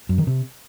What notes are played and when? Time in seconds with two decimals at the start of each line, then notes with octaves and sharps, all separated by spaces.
0.09 F#2
0.18 D#3
0.27 C3